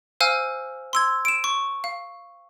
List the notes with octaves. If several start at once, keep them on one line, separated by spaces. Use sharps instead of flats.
C5 F5 G#5 E6 F6
C6 E6 G#6
D7 E7
C#6
F5